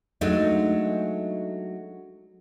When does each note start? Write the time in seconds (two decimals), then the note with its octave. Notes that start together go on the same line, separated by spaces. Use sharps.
0.21 F#3 G#3 A3 D4 D#4